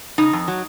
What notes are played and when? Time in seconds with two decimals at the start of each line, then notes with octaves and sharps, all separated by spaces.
0.18 C#3 D#4
0.33 F2
0.48 F#3